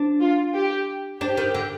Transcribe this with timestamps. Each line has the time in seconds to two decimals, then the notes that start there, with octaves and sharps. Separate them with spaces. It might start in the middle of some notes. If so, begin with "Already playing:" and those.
Already playing: D4
0.21 F4
0.54 G4
1.21 D4 G4
1.37 D#3
1.54 D3